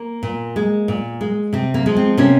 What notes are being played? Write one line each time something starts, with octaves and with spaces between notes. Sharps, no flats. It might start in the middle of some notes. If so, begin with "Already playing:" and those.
Already playing: A#3
A#2
G#3
A#2
G#3
C3 C4
A#3
F3 G#3
C4
C3 A#3 C#4